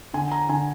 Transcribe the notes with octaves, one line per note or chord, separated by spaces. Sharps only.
D3 G#5
A#5
D3 G#5